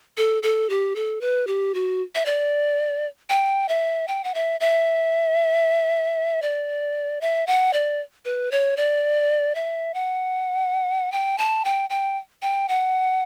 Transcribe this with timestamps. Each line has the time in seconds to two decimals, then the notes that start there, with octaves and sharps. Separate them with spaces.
0.17 A4
0.43 A4
0.70 G4
0.96 A4
1.21 B4
1.47 G4
1.74 F#4
2.15 E5
2.26 D5
3.30 G5
3.69 E5
4.08 G5
4.24 F#5
4.34 E5
4.60 E5
6.42 D5
7.21 E5
7.47 F#5
7.73 D5
8.25 B4
8.51 C#5
8.77 D5
9.55 E5
9.94 F#5
11.12 G5
11.38 A5
11.65 G5
11.90 G5
12.42 G5
12.69 F#5